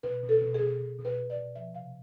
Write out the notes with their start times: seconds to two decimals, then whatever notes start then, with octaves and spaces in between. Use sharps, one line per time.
0.03 B2 B4
0.23 B2
0.29 A4
0.42 B2
0.54 G#4
0.61 B2
0.80 B2
0.99 B2
1.05 B4
1.17 B2
1.30 D5
1.36 B2
1.55 F3 E5
1.74 C3 F5